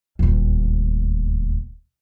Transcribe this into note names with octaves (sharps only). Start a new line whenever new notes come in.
D#1 D2